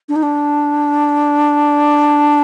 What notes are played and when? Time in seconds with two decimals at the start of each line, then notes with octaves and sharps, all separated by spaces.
0.09 D4
0.16 D#4
0.23 D4